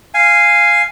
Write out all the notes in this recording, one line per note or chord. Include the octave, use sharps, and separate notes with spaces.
F5 G#5